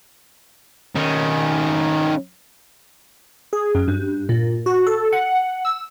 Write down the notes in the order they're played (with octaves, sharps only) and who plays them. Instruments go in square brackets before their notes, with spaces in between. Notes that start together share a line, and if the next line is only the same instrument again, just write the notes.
[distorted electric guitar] D#3 C#4
[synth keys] G#4
F#2
G2
A#2
F#4
A4
F#5
E6